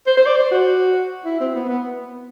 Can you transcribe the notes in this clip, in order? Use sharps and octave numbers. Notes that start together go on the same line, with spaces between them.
C5
C5
D5
C5
F#4
E4
C4
B3
B3